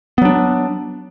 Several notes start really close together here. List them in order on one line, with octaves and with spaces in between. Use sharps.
B3 F#3 D4